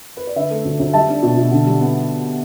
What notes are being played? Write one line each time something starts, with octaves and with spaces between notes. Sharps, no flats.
B4
D5
D3 B4 E5
A3
D2
D2
G3 E5 A5
D4
B2
B2
D3
G3
B3